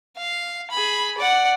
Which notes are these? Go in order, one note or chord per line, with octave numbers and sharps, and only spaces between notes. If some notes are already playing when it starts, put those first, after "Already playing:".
F5
G#4 B5
D5 F#5